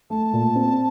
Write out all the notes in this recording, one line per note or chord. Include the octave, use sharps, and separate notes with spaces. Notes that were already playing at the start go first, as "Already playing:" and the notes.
A3 A5
A#2
C4